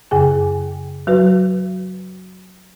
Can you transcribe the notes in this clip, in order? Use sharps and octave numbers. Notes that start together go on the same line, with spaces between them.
F#2 C#3 G#4 G#5
F#3 F#4 B4